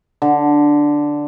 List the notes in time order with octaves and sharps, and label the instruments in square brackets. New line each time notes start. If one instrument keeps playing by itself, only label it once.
[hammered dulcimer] D3